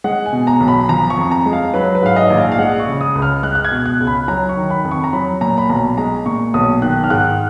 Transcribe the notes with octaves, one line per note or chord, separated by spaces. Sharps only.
G#3 F#5
G#5
B2
A#5
B1
B5
F3 A#5
C#6
F2
A#5
G#3
F5
F#3 B4
B4
G#2 F5
D#5
A#1
F5
F5
G#3 F#5
C#6
C#3
D#6
C#2
F6
G#3 F#6
F#6
G#6
B2
F#6
C#2
B5
F#3 A#5
C#6
D#3
B5
F2
C#6
A#5
F#3 B5
A#2 A#5
B5
B1 A#5
G#3 A#5
A#2 C#6
B1 D#6
D#3 F#6
F6
G#2 F#6